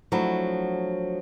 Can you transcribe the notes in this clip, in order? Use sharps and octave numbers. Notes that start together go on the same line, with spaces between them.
F3 F#3 A3 D4 E4